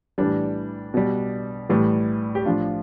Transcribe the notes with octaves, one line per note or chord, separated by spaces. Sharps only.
A2 E3 G3 D4
B2 G3
A2 E3 G3
G4
A2 F3 D4 F4